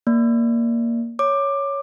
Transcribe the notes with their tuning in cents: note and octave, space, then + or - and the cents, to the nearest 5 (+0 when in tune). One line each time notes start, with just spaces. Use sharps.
A#3 +0 D5 +0
C#5 +5 D6 +15